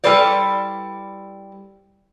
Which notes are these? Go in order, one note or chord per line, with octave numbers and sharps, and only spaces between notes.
G3 E4 A4 B4 C5 D5